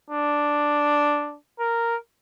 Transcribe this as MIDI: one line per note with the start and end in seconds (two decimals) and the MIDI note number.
0.10 1.37 62
1.60 1.96 70